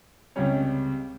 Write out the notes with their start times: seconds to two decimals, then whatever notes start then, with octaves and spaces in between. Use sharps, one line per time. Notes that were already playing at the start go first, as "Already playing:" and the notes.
0.36 C#2 C3 G3 C#4 C#5